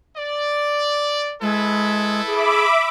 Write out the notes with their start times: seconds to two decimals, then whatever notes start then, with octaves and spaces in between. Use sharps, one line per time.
0.17 D5
1.42 G#3 E4 A4 B4
2.27 G#4 E5 B5 D6